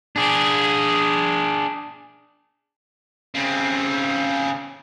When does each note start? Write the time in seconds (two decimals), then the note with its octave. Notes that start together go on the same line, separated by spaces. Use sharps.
0.16 D4 G#4
3.35 C#3 C4